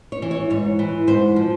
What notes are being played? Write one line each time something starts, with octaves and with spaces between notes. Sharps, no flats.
C#5
E3
C#5
G#2 C#5
E3
G#2 C5
F3